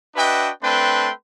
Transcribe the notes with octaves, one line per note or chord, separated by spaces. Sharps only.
D4 F#4 B4 D#5 E5 G5
A3 C4 D4 B4 G5 C6